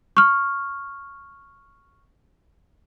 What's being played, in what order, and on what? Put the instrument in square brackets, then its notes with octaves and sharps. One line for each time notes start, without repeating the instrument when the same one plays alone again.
[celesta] C#6 F6